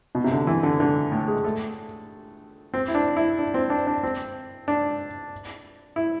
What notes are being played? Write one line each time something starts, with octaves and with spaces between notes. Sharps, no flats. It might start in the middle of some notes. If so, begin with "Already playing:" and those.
B2
C3
D3
E3
D3
D3
A2
G#3
A3
C4
E4
D4
E4
D4
C4
D4
D4
C4
D4
E4